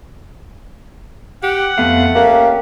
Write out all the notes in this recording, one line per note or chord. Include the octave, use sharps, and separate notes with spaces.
G4 F#5
F2 A3 B3 F5
A#3 C#4 G4